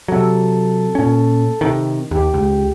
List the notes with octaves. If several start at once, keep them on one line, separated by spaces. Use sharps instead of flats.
C3 F#3 A4
A#2 C#4
C3 D#3
D#2 G4
C#2